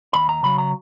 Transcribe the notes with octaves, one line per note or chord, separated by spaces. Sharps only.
D#2 B5
A#5
C#3 F#3 B5
A#5